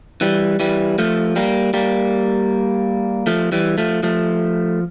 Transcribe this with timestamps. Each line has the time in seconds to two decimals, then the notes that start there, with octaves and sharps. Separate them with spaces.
0.21 E3 G3
0.60 E3 G3
0.98 F3 A3
1.36 G3 A#3
1.74 G3 A#3
3.27 F3 A3
3.52 E3 G3
3.78 F3 A3
4.03 F3 A3